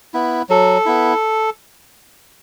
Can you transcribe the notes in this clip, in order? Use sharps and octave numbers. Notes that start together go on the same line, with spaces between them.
B3 E4
F#3 A4
B3 E4